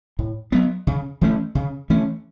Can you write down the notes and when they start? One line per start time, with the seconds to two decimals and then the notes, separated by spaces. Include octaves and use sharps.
0.19 A2
0.52 F#3 B3
0.87 C#3
1.21 E3 A3 C#4
1.55 C#3
1.90 E3 A3 C#4